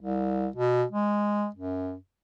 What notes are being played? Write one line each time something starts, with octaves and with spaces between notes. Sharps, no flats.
C2
B2
G#3
F#2